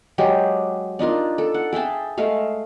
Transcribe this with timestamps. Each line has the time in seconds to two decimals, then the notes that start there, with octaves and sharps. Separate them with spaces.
0.18 F#3 G#3 G4
0.99 D4 D#4 F4 A#4
1.38 A4
1.54 F#5
1.73 G#4 E5 G5 A5
2.18 G#3 A3 F5